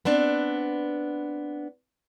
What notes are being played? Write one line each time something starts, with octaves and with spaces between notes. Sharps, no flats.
B3 C4 D4